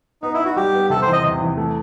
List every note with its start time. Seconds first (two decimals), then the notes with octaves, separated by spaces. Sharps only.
0.22 B3 D#4
0.34 E4
0.40 D#4
0.45 F#4
0.57 G3 G4
0.73 B3
0.90 C3 A4
1.02 E2 C5
1.13 D#5
1.24 C3
1.41 E2
1.57 A3